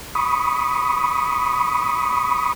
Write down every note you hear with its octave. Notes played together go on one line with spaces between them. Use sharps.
B5 C#6 D#6